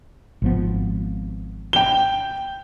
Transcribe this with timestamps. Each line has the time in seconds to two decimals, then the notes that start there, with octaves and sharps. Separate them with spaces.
0.42 G#1 F3 B3
1.73 G5 G7